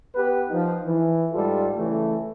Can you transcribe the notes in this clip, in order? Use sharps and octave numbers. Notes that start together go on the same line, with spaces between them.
B3 G4 B4
F3 D#4
E3
G#2 G3 F4 A4
C#3 E3 A3